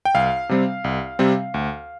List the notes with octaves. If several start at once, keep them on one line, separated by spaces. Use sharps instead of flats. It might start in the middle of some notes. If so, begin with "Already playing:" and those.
G5
C2 F5
C3 G3 C4
C2
C3 G3 C4
D2